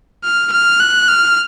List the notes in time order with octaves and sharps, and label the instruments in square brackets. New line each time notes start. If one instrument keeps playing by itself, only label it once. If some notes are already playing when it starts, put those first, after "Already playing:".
[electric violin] F6
F6
F#6
F6